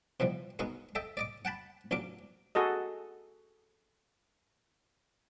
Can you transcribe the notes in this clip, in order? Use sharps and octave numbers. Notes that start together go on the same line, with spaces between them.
B2 E3 F3 G3
G#3 B3 D#4 F#4 A#4
A4 D#5 E5 G5
D5 D#5 D6
F#5 G5 A5 B5
A1 A#2 F#3 D4 D6
F#4 G#4 A4 D#5